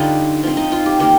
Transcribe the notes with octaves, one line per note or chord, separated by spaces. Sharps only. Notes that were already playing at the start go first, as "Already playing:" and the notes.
Already playing: D3 G3 D4 D#4 F4
F3 C4
D#4
F4
G4
D#3 A#3 G4